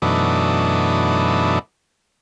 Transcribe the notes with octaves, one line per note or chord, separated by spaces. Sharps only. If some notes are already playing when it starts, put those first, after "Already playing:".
F#2 B2 E3 A3 D4 D#4